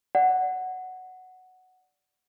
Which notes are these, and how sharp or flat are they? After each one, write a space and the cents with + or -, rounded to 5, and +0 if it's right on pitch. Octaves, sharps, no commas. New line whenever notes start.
D5 +0 F#5 +0